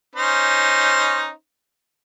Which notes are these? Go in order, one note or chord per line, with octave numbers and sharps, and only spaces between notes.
C#4 D#4 C5